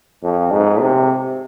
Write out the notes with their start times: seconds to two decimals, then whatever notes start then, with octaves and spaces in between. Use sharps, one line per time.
0.23 F2
0.51 G#2
0.80 C3